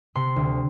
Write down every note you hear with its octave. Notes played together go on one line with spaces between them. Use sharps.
C3 C6
D2